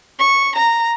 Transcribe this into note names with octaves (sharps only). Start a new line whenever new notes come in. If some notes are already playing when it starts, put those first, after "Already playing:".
C#6
A#5